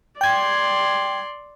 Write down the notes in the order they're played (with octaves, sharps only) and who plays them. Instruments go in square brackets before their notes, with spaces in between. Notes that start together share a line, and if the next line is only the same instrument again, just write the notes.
[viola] D5 C6 [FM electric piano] G5 G#6